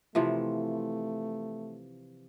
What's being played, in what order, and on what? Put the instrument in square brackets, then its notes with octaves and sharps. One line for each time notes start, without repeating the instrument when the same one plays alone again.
[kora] C3 E3 F3 [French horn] A3